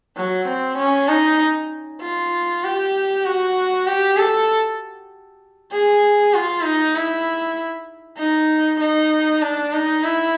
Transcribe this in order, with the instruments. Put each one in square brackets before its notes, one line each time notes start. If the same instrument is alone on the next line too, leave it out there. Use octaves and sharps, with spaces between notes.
[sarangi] F#3
C4
C#4
D#4
F4
G4
F#4
G4
A4
G#4
F4
D#4
E4
D#4
D#4
D4
D#4
E4